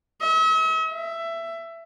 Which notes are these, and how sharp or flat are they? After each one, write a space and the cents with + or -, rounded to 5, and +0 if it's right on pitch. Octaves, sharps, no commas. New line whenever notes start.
E5 -45
E5 +15